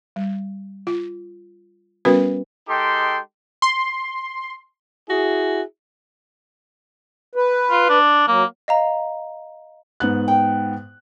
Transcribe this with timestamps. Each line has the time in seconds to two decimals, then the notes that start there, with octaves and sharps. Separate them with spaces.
0.16 G3
0.87 F4
2.05 G3 B3 C#4 F#4 A#4 B4
2.68 G#3 D#4 G4 A4 G5 C6
3.62 C6
5.10 E4 F#4 G#4
7.35 B4
7.70 F4
7.89 D4
8.28 F#3 A#3
8.68 D#5 F5 A#5
10.00 G#2 B3 F#6
10.28 G5